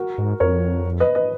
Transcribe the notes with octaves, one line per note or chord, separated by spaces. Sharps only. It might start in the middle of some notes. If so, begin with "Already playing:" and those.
Already playing: F#4 A#4
G#2
F2 A#4 C#5
B4 D#5
B4 D#5